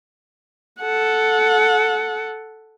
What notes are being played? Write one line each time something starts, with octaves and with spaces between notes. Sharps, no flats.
A4 F#5